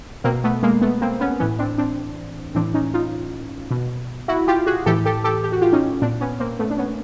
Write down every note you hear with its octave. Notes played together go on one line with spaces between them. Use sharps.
B2 A#3 C4
A3 B3
G#3 A#3
A3 B3
A#3 C4
B3 C#4
A2 E3 B3 C#4
C4 D4
C4 D4
A2 E3 C4 D4
C#4 D#4
D#4 F4
B2
E4 F#4
F4 G4
F#4 G#4
A2 E3 G4 A4
G4 A4
G4 A4
G4
F#4
F4 G4
C#4 D#4
A#2 C4 D4
B3 C#4
A#3 C4
A3 B3
D4
B3 C#4